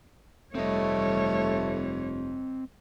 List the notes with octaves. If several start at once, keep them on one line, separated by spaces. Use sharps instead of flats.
F1 G3 A3 C4 C#5 D#5